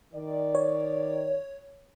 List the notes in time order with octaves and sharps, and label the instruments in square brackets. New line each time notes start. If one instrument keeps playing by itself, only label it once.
[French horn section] D#3 D5
[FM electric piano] C#5